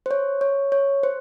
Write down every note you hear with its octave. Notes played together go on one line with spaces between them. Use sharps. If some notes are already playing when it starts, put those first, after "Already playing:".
C5
C#5
C#5
C#5
C5